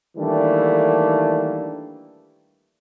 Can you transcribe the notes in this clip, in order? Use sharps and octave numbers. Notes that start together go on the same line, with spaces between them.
D#3 E3 G3 A3 A#3 D4